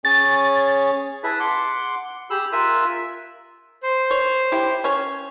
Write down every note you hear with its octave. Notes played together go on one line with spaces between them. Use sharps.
C#4 G#4 C#5 A6
E4 G#4 B4 E5 A5
F#5 C6 D6
G4 G#4 B5 E6
F4 A#4 E5 G#5 E6 F#6
C5
C#5
E4 G4
C#4 C#5